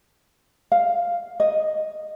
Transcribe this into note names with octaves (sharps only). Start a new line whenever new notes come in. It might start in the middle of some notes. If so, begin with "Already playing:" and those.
F5
D#5